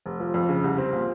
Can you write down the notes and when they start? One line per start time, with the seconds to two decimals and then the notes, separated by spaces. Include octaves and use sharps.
0.06 F1
0.20 F3
0.34 F2
0.49 C#3
0.64 C2
0.78 C4
0.93 A#2